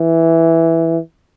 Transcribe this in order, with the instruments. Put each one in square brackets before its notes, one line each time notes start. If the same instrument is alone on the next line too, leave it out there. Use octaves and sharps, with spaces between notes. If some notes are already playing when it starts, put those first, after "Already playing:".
Already playing: [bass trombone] E3